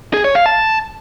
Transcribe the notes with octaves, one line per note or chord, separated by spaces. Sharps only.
G#4
C#5
F5
A5